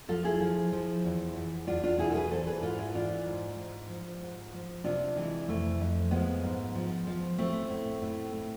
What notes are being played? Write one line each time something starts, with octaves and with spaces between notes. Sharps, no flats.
F3 F4 A4
E4 G#4
F3
F3
E2
E2
E2 D4 F4
D4 F4
B2 E4 G#4
A4
G#4 B4
E3 A4 C5
G#4 B4
G#2 F4 A4
E4 G#4
E3 D4 F4
G#2
G#2
F3
G#2
F3
C3 D4 F4
E3 G#3
F2 A3
F2
F3 G#3 B3
G#2
F3
F3
A2 A3 C4
A2
A2
A2